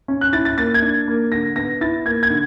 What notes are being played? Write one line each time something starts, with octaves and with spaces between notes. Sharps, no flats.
C#4
F#6
E4 A6
A6
A#3 A6
G#6
D4
A#3
D3 A#6
B3 A#6
E4 A6
A#3 G#6
G#6
D3